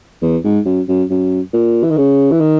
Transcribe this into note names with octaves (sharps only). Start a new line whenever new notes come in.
E2
G#2
F#2
F#2
F#2
A#2
E3
D#3
C#3
E3
D#3